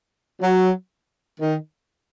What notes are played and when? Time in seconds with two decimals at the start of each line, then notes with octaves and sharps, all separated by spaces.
0.41 F#3
1.40 D#3